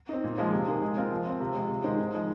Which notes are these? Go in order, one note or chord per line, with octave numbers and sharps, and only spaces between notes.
C4 D#4
A#2
F3 G#3 F4
C3
D#3 A#3 G#4
G#3
C4 F4 A#4
F3
C4 F4
C3
G#3 F4
C3
D#3 G#3 D#4 C5
G#2
F3 G#3